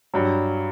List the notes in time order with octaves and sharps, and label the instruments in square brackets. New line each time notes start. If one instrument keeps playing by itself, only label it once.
[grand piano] G2 F#3